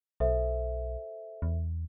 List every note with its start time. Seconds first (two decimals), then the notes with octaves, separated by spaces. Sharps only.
0.20 B1 A4 C5 E5
1.42 E2